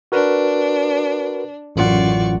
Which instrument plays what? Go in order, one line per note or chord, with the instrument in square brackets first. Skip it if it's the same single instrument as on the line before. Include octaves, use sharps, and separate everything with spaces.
[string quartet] D4 [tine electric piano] F#4 A#4 B4
[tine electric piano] A1 F4 F#5 [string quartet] F#2 D5 C#6